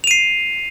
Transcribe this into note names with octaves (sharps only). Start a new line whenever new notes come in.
C7 D#7 F7